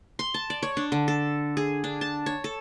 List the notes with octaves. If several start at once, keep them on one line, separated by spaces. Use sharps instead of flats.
C6
A5
D5
C#5
D4
D3
A4
G#4
D4
A5
C#5
A4